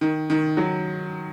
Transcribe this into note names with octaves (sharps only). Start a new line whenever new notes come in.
D#3
D#3
F#3